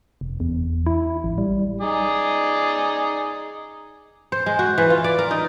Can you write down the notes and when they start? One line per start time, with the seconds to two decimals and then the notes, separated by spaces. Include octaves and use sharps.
0.21 F1
0.40 E2
0.86 E4
1.24 A1
1.38 G3
1.81 D#4 G#4 D5
4.32 C5
4.46 G#3
4.59 F#4
4.78 E3
4.90 F4
5.04 D5
5.19 A#4
5.31 D#4